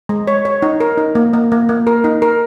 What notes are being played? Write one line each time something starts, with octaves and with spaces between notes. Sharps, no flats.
G#3
C#5
C#5
D#4
A#4
D#4
A#3
A#3
A#3
A#3
A#4
D#4
A#4